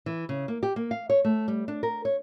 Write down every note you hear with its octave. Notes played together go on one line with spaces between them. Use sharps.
E3
C#3
A#3
G4
A#3
F5
C#5
A3
G3
D4
A#4
C#5